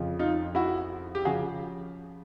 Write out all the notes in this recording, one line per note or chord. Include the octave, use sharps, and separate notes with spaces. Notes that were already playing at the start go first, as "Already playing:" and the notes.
Already playing: F2 C#3 F3
D#4 F4
E4 F#4
G4
C#3 F3 F#4 G#4